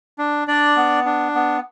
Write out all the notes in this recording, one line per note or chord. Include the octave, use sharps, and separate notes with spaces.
D4
D4 D5
B3
D4
B3